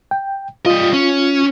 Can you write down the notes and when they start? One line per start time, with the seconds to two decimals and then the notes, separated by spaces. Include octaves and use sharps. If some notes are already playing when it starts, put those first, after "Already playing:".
0.11 G5
0.66 G3 F4 D#5
0.93 C#4